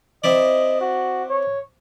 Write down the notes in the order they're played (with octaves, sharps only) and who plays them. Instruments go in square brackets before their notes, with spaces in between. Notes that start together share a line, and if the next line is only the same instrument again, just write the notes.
[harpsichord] C4 E4 D5 [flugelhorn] D#5
[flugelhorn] F#4
C#5